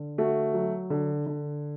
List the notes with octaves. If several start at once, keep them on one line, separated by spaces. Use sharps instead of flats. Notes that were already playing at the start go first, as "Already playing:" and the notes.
Already playing: D3
A3 F#4
F#3
D3
D3